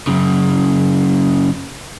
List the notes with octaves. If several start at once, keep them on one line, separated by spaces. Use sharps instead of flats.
F#2 C#3